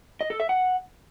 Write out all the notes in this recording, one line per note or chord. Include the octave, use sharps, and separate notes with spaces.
D#5
A4
E5
F#5